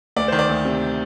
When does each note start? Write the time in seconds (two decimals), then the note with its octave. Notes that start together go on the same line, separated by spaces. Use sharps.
0.16 D2 D5
0.28 D#3 C5
0.39 D5
0.49 D2
0.65 C3